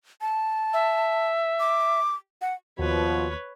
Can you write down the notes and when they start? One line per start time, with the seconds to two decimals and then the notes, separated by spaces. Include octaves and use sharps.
0.21 A5
0.73 E5
1.60 D6
2.42 F#5
2.79 D#2 B2 F3 F#4 B4 C#5